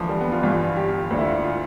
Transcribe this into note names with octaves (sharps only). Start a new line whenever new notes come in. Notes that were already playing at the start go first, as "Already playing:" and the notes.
Already playing: D2 D3 E3 F3
G3
B3
F4
G1 G2 E3 F4
G4
D2 D3 F4
E4
F4
F4